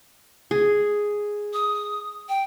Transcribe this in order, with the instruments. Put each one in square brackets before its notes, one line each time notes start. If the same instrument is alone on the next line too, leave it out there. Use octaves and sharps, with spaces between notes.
[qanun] G#4
[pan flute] D#6
G5